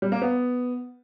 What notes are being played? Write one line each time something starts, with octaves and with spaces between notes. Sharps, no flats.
G3
A#3
B3